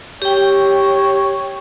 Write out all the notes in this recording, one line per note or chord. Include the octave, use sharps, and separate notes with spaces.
G4 C#5 G5